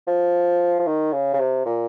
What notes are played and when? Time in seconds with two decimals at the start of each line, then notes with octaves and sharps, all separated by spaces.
0.07 F3
0.80 F3
0.87 D#3
1.13 C#3
1.34 C#3
1.39 C3
1.66 A#2